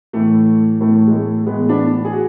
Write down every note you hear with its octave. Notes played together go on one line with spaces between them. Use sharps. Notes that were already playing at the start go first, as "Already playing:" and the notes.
A2 E3 A3
A2 E3 A3
G#3
A3
A2 E3 G#3 B3
B3 D4
G#4
F#4